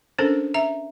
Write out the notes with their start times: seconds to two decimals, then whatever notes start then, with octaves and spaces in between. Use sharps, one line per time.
0.18 C#4 D4 A4 A#4 C5
0.54 E5 A#5